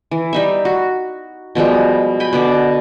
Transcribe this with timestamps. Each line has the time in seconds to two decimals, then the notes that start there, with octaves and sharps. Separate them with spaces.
0.11 E3
0.33 G3 D#4 E5
0.65 F#4
1.55 B2 F3 G3 G#3
2.20 G5 G#5 B5
2.33 B2 D3 D5